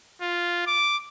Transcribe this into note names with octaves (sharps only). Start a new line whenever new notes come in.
F4
D6